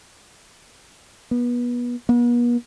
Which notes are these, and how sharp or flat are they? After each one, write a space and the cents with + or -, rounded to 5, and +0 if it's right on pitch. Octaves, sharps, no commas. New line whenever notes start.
B3 -25
B3 -45